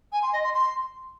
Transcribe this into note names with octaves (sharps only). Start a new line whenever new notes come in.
G#5
C6
D#5
C6
C6